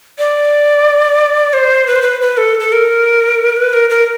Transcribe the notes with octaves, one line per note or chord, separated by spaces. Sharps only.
D5
C5
B4
C5
B4
B4
A4
A4
A#4
B4
A#4
A#4